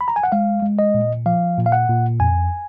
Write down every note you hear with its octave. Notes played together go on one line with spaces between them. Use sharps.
B5
A#5
G#5
F#5
G#3 F5
G#3
D#5
A#2
F3 F5
A#2
F5
F#5
A#2
F2 G#5